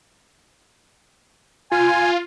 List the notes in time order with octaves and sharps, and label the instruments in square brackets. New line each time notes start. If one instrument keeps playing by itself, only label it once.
[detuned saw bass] F4 [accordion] G#5